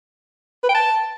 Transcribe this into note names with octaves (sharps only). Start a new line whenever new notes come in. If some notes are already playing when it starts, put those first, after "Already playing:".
B4
G5
A5